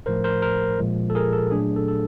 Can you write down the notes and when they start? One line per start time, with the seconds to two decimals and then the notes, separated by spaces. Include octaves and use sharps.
0.06 A2 F3 A3 A#4 C5
0.24 A#4 C5
0.42 A#4 C5
0.79 A#2 F3 G#3
1.10 A4
1.15 G#4 A#4
1.33 A4
1.51 A#2 F#3 A3 D4 G#4
1.76 A4
1.88 A4